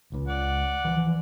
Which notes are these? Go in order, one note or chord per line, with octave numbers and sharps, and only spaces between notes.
C#2 C#3
D5 F#5
E3 F3